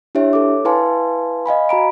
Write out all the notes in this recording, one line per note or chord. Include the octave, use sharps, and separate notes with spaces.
D4 E4 G4 C#5 E5
A4 C#5 D6
E4 B4 F5 G#5 A5 C6
D#5 F5 G#5 B5
F#4 A#5 B5 D7